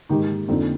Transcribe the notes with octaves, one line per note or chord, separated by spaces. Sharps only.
G#2 D#3 D#4 G4
F2 D3 F3 C4 D#4